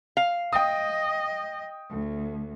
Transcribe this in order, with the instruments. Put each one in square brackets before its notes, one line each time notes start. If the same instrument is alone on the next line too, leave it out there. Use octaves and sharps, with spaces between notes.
[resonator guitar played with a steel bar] F5
[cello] D#5 [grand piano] G5 D#6
[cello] D2